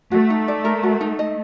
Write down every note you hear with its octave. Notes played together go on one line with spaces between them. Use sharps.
A3 F#4
D#4
D5
A#4
F#4
D#4
D#5